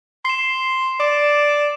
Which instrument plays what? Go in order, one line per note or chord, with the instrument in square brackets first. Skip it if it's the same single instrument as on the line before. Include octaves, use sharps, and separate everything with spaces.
[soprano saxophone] C6 [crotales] C7 E7
[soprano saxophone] D5 [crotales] D6